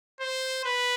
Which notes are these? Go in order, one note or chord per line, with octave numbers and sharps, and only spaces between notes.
C5
B4